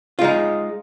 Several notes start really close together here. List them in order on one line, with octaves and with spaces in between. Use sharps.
F4 G#3 D#4